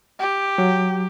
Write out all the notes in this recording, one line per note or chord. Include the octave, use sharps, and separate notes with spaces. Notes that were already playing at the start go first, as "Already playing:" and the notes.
G4
F#3